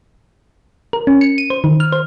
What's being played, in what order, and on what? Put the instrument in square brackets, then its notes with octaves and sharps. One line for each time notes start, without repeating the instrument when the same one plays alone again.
[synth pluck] A#4
C#4
C#7
D#7
C5
D#3
F6
C5